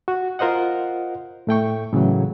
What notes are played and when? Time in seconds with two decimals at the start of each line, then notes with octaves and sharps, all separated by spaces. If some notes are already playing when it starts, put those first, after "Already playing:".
0.08 F#4
0.39 F4 A#4 C5 D#5 F#5
1.47 A2 A3 G5 C#6
1.93 A2 C#3 E3 F#3